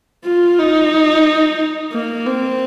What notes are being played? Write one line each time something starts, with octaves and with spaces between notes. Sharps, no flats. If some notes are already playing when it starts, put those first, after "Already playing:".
F4
D#4
A#3
C4